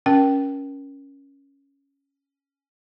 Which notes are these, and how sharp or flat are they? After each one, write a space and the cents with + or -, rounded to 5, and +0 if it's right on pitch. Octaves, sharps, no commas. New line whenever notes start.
C#4 +0 A#4 +30 G5 -15